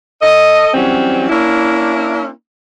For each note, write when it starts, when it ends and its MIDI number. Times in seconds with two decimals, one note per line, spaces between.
0.22 0.70 69
0.22 0.70 75
0.74 1.28 52
0.74 1.28 54
0.74 1.28 55
0.74 1.28 60
0.74 1.28 61
1.30 2.29 58
1.30 2.29 61
1.30 2.29 62
1.30 2.29 64